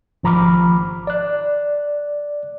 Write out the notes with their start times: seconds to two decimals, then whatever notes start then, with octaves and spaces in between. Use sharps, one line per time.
0.23 G#1 F3 A#5 B5 D6 F6
1.07 D5 F#6